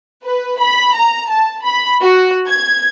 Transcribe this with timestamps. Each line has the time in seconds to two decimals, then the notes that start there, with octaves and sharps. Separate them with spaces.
0.24 B4
0.59 B5
0.96 A#5
1.30 A5
1.64 B5
2.02 F#4
2.48 G#6